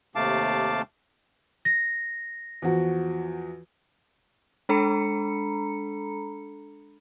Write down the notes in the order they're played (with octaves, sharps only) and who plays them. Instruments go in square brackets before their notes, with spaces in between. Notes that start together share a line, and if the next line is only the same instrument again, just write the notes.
[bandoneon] D#2 C3 A3 F5 A5 D6
[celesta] A#6
[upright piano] E2 F3 F#4
[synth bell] G#3 D4 A4 A#5 B5 C#7